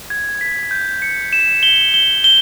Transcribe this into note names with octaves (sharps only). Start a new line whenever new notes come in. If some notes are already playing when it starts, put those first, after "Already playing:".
G#6
B6
G6
C#7
E7
G7
G7
G7